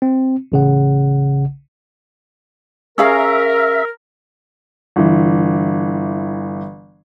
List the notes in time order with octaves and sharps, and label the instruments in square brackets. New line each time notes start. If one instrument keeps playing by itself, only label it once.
[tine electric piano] C4
A1 C#3 F#5
[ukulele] C#4 G#4 F5 [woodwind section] A#4 [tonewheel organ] E5
[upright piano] G1 E3